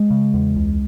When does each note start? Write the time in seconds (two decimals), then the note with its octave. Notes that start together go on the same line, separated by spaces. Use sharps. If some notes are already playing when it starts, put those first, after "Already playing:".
Already playing: G#3
0.10 C#3
0.34 E2
0.56 C#2